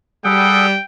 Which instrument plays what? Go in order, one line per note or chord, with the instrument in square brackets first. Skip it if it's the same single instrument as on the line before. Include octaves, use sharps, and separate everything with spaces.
[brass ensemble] G3 [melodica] G#4 A4 F#5 [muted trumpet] G5